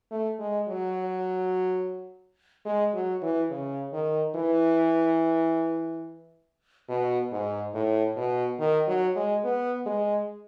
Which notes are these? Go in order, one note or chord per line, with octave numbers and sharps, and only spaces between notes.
A3
G#3
F#3
G#3
F#3
E3
C#3
D#3
E3
B2
G#2
A2
B2
D#3
F#3
G#3
B3
G#3